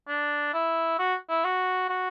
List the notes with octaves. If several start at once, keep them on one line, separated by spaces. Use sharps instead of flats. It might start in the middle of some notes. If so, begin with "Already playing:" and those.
D4
E4
F#4
E4
F#4
F#4